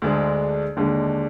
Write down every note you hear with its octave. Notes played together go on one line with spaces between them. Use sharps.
D2 D3 G#3 D4 G#4
D#2 D3 G#3 D4